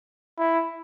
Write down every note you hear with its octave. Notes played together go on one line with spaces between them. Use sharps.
E4